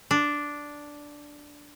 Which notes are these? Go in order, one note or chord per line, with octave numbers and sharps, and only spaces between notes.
D4